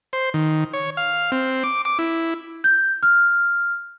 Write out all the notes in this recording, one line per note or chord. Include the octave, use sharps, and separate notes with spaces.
C5
D#3
C#5
F5
C4
D6
D6
E4
G6
F6